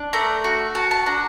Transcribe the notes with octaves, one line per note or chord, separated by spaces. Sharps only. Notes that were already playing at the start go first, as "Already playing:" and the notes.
Already playing: D4
A3 A#5
F#4
F#4 A5
A5
D4 A#5